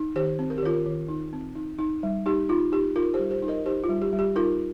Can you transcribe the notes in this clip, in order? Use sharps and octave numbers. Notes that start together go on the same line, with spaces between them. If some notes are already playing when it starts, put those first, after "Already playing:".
Already playing: D#4
D#3 G4 C5
C4
A#4
G4
D#3 F4 A#4
D#3
D#4
C4
D#4
D#4
G3
D#4 G4
D#4 F4
D#4 G4
D#4 F4 A#4
G4 C5
G3
G4 C5
D#4
A#4 D#5
D#4 G4 C5
F4
G3
G4
G3
G4
D#4 F4 A#4